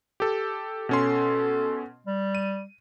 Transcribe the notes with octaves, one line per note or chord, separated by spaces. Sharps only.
G4 A4
B2 C#4 A4 C6
G3
D#7